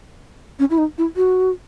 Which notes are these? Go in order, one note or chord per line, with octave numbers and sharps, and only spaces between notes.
C#4
E4
D#4
E4
F#4